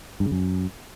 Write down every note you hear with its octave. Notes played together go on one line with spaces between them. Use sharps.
G2
C#3
F#2